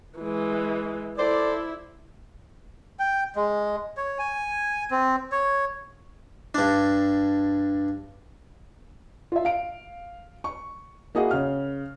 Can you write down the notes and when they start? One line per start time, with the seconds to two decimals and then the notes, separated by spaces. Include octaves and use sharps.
0.19 E3 G#3
1.19 E4 A4 C5 D5
2.99 G5
3.36 G#3
3.97 C#5
4.19 G#5
4.91 C4
5.32 C#5
6.55 G2 D4
9.32 F4 E5
9.45 F5 D7
10.44 C#6
11.15 A#3 E4 F#4 G#4 D#5 F#5
11.31 C#3 F6